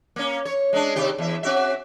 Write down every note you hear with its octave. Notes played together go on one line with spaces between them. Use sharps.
A#3 C#4
C#5
G#3 C#4 D4
C3 D#3 G4
E2 E5
C4 F#4 E5